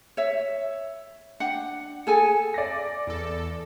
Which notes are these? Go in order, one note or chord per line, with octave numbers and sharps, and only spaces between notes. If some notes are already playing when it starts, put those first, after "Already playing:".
C#5 E5
D4 F#5 G5
G#4 A4 G#5
D5 A#6
E2 A4